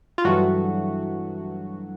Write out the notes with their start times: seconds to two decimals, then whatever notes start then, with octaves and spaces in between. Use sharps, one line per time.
0.18 F4
0.24 G2 E3 F#3 A3 F#4